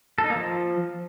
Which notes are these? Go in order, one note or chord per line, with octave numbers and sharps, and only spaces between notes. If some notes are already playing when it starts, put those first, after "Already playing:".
A4
D#4
A#3
F3